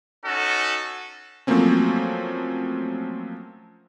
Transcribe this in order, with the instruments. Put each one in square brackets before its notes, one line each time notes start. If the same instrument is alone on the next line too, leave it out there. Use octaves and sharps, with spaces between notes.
[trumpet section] C#4 D#4 F#4 A4
[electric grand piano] F3 F#3 A3 A#3 C4 C#4